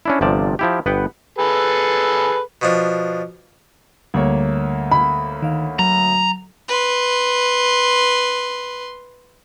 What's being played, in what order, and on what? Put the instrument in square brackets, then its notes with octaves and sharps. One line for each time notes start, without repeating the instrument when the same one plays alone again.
[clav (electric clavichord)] C#4 D4 E4
G1 C3 F3 D5 A5
F3 E4 G4
G1 B3 B4 F#5 G5
[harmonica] G#4 A4 B4
[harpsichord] B2 F3 D4
[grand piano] D2 A#3 C#5 [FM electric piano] G3
[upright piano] B5
[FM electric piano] D#3 F5
[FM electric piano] F#3 [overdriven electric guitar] A#5
[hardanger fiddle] B4 C6